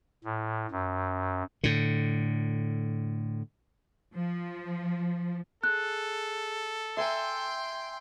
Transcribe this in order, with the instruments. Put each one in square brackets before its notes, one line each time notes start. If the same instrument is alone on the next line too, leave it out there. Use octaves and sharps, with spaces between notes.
[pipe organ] A2
F#2
[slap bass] A2 D3
[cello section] F3
[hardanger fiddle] G#4 [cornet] A4 [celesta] F#6
[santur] E5 G#5 A#5 [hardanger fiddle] G5 C6